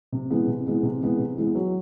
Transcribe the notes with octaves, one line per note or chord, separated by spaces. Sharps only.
C3
E3 G#3 B3
C3
E3 G#3 B3
C3
E3 G#3 B3
C3
E3 G#3 B3
F#3